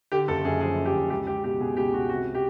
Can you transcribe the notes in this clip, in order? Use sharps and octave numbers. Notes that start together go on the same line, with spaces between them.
D3 G4
F#1 A4
F#2 G#4
F3 G#4
D3
G4
F#1
C#2 G4
C#2 G4
B2 G4
B2 G#4
C#2 G4
C#2 F#4
C3 F#4
G4